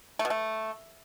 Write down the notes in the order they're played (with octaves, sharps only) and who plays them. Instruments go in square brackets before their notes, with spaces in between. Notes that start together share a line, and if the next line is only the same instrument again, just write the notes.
[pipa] A3
B2
A3